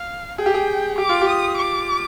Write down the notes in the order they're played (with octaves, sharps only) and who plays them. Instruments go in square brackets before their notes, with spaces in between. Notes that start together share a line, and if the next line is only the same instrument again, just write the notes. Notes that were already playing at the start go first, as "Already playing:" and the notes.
Already playing: [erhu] F5
[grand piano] G#4 [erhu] G5
[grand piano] G4
G#4
[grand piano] G4 [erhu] D6
[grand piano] F4
G4
[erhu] D#6
D6